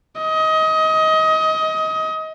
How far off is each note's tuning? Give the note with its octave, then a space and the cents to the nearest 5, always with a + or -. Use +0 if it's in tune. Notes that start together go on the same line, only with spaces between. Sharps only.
D#5 +25